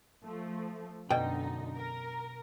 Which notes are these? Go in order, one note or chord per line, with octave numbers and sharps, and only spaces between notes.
F3 A3
F#2 B2 D3 D#4 G5
A#4